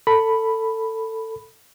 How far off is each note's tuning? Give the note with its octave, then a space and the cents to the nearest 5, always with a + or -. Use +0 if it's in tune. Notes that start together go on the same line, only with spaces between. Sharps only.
A4 +20 B5 +0